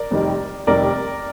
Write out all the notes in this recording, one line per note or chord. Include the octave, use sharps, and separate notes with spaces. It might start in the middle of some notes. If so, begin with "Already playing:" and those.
Already playing: A#4 D5
F1 F2 D#3 G3
F1 F2 D#3 G3 A#4 D5